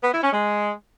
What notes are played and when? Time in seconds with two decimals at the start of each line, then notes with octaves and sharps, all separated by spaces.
0.02 B3
0.13 E4
0.23 C#4
0.33 G#3